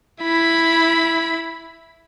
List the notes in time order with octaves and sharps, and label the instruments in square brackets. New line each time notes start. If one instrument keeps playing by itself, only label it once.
[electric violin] E4 B5